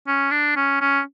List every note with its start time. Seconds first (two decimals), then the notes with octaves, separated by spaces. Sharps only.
0.07 C#4
0.31 D4
0.56 C#4
0.81 C#4